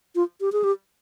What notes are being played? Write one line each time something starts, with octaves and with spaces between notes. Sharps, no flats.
F4
G4
G#4
G4